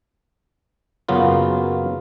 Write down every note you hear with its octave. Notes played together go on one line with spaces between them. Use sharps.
F#2 C#3 F#3 A#3 B3 F4